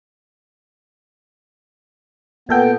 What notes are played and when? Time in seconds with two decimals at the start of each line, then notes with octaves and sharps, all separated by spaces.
2.49 A#2 B3 A4 G5